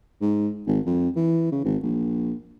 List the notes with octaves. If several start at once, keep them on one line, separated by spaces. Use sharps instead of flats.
G#2
G#1
F2
E3
C#3
G#1
A#1